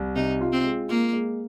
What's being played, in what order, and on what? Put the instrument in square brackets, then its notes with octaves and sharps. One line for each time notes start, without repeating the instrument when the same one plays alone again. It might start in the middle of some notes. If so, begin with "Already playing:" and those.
Already playing: [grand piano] C2
[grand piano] C3 [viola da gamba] D#4
[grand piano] F4
[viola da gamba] C4
[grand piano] G#3
[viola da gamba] A#3 [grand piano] F4
[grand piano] G#3